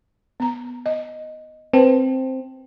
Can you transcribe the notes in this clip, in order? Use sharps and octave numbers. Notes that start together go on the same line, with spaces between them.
B3 A#5
D#5
C4 B4 A5